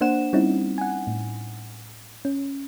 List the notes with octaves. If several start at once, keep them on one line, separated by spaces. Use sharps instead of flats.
A#3 D4 C5 F#5 E7
G3 C4 C#4 D#4 E4
F#5 G#5
A2
C#4